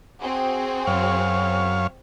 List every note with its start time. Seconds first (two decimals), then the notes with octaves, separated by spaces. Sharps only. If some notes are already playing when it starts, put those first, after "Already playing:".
0.20 C4 F#4 G#4
0.87 F#2 C#5 F5